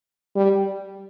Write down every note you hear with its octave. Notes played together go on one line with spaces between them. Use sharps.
G3